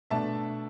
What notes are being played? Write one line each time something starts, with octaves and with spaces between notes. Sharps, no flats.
B2 A3 D4 E5 A5